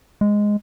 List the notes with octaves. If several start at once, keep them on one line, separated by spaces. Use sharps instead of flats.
G#3